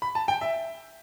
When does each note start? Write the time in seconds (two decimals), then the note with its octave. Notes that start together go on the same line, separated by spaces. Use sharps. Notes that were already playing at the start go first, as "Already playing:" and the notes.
0.02 B5
0.15 A5
0.28 G5
0.41 E5